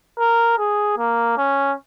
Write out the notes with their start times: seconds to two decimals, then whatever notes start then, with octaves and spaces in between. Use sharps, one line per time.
0.18 A#4
0.58 G#4
0.98 A#3
1.38 C#4